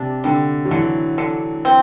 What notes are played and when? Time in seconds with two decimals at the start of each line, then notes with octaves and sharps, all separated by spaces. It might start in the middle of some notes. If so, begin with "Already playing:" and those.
Already playing: C3 D4
0.24 D3 G3
0.65 F#3
0.71 D3 E3
1.18 D3
1.65 C4